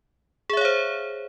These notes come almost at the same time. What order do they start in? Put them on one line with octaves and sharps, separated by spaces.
G#4 E5 C#5 F5 C5